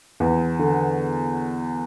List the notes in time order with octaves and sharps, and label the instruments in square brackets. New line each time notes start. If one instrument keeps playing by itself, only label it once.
[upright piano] E2
D3